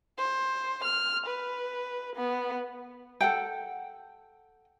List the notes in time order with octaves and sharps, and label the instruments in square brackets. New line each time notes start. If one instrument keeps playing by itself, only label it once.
[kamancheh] C5
F6
B4
B3
[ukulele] A4 F#5 G5